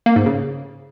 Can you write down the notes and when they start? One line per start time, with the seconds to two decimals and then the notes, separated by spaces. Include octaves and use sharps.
0.06 A#3
0.16 G#2
0.26 C#3